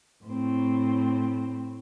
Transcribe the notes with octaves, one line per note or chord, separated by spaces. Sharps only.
A2 C4